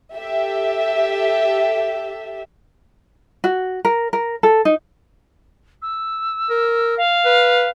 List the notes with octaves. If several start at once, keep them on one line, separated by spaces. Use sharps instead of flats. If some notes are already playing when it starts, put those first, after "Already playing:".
G4 A4 E5
F#4
A#4
A#4
A4
D#4
E6
A#4
F5
B4